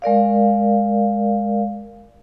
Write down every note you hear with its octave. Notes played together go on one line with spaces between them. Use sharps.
G#3 A#4 D5 F5